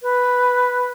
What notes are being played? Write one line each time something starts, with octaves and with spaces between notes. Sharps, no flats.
B4